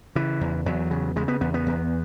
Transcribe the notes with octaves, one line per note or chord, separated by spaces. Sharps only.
C#3 E3
E2
E2 F#3
C#3
C#3 G#3
B3
E2 B3
B3
E2